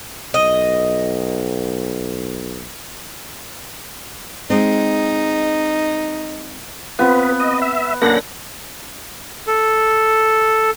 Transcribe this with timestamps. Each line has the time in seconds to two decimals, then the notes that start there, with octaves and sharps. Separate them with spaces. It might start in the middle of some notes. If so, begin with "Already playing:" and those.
0.34 B1 D#5
4.50 G#3 C4 D#4
6.99 B3 C4 F4 B4
7.40 D#5
7.62 E5
8.02 F#2 D3 A#3 F#5 A#6
9.47 A4